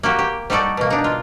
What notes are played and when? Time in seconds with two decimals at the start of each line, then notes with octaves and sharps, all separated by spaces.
0.03 A#3 F#4 G4
0.19 G4
0.50 G3 D#4 F#4 A4 D5
0.77 B2 A#3
0.90 D4 D#4
1.04 F4